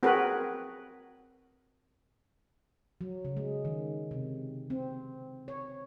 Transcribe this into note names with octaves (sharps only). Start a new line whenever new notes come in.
C4 F#4 G#4 A#4 B4
F#3
C#3
G#3
D#3
C3
C4
C#5